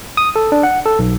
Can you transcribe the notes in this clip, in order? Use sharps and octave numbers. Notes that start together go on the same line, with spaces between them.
D#6
A4
D4
F#5
A4
B1